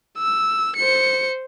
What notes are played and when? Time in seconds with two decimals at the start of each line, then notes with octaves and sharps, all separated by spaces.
0.18 E6
0.76 C5 C#7